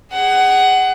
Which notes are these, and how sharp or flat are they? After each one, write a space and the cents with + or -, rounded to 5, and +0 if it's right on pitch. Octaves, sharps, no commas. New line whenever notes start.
G#4 -20 F#5 +20